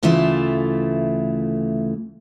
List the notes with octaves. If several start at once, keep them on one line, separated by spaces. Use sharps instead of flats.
D2 C#3 E3 A3 F4 E5